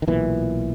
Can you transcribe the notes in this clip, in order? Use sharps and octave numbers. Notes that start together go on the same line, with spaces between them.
D#3
B1 A#2 E3